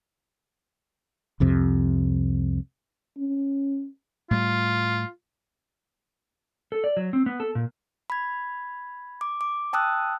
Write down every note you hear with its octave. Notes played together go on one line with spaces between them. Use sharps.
C2 F2 C3
C#4
A2 G3 F4
A4
D5
F#3
C4
B3
A4
A#2
B5 G#6
D6
D6
G5 A5 D#6 E6 F#6